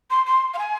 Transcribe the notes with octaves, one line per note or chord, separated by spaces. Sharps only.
C6
C6
F5
G#5